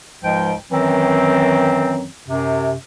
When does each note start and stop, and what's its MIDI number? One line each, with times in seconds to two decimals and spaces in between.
0.23 0.53 37
0.23 0.53 44
0.23 0.53 53
0.23 0.53 56
0.23 0.53 79
0.71 2.06 42
0.71 2.06 51
0.71 2.06 52
0.71 2.06 54
0.71 2.06 60
2.28 2.72 42
2.28 2.72 48